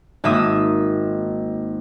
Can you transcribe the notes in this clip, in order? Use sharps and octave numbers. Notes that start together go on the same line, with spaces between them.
G#1 A#3 E5 D#6